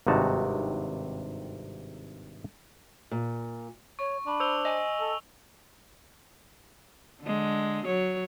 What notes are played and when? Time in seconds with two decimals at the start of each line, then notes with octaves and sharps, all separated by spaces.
0.07 G#1 G2 C3 D#4 F#4 A5
3.11 A#2
3.99 C#5 C#6
4.27 D4 B5
4.40 C5 E6 F7 G7
4.65 D#5 G#5
5.00 A4
7.23 D3 G#3
7.85 F#3 C#5